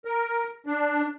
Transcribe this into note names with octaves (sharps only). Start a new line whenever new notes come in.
A#4
D4